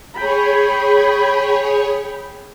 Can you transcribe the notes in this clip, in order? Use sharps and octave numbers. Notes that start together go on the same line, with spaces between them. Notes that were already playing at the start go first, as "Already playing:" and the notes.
G#4 C#5 G5 B5